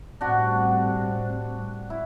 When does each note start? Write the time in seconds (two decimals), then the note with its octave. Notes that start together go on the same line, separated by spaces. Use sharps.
0.21 A2 G3 C4 D4 F#4
1.90 E4